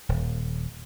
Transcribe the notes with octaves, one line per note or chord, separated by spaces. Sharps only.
D#1